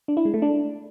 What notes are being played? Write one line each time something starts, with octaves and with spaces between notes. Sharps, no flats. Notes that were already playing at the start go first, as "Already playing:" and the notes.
D4
E4
G#3
A3
D4